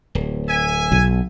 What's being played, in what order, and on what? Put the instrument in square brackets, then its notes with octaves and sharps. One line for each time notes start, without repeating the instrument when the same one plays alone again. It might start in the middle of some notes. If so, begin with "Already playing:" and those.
[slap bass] D1
[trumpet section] E5 G#5
[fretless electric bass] B1